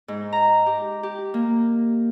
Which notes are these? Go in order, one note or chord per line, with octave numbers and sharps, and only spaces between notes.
G#2
A#5
G4
G4
A#3